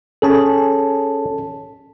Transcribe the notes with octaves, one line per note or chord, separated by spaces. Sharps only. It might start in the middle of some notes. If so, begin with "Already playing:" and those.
C#4 G#4 A4 A5